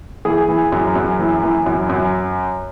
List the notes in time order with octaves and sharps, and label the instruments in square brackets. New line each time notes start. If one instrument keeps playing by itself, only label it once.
[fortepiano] E3 G#4
E3
F#2
F#2
E3
E3
F#2
F#2